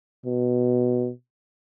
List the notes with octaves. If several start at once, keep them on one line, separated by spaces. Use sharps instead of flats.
B2